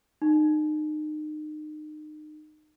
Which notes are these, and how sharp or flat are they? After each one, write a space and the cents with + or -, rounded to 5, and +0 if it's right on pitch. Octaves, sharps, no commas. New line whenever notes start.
D#4 -30